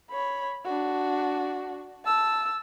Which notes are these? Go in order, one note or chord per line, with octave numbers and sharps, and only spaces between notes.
C#5 B5
D4 F#4
A5 E6